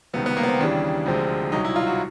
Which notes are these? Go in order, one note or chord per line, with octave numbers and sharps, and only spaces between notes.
C#2 C3 D#3 G3 B3
B3
A#3
B3
C4
D#2 C#3 E3 G3 D4
D2 C3 F3 G#3
C2 B2 F#3 D#4
E4
F4
F#4